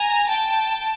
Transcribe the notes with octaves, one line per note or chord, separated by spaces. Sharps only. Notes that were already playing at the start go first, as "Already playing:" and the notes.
Already playing: G#5 A#5
G5 A5